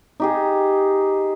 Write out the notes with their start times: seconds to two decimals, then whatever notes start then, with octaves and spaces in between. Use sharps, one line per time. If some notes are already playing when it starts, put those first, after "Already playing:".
0.20 D#4 G4 G#4